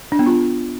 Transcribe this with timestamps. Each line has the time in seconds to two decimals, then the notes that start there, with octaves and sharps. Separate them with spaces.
0.12 D4
0.19 B3
0.26 F4